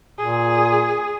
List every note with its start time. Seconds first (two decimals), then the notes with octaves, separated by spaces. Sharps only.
0.19 A#2 G#4